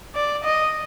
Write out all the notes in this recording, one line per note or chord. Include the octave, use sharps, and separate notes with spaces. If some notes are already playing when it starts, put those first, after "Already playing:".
D5
D#5